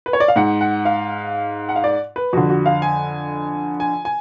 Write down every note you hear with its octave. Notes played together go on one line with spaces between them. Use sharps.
B4
C#5
D5
F5
G#2 F#5
F#5
F5
F#5
F5
D5
B4
F2 D3 F#4
F#4
F5
G#5
G#5
G#5